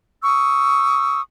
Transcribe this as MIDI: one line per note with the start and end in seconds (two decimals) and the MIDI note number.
0.23 1.20 85
0.23 1.20 87
0.23 1.20 88